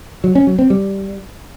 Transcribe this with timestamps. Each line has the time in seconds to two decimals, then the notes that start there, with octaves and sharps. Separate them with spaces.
0.24 F#3
0.35 C#4
0.47 F#3
0.59 C4
0.70 G3